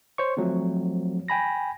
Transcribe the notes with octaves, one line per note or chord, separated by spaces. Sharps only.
C5 C#5 C#6
F3 F#3 A3 C4
G5 G#5 B5 A#6